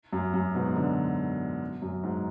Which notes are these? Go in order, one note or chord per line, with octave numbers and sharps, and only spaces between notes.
F#2
F#2
G#2 B2
B2 D3
F#2
G#2